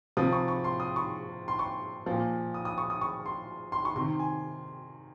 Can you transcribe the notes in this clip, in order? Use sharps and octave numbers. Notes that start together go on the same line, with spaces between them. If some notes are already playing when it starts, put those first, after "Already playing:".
C3 F3 D#6
C#6
C#6
C6
D#6
C#6
C6
C#6
A#2 F3
D#6
D#6
C#6
D#6
C#6
C6
C6
C#6
C3 D#3 C6
G#5